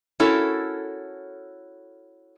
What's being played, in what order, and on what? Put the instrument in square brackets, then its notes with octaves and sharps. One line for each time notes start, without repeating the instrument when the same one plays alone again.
[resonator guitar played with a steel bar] C#4 E4 F#4 A4 A#4 C#5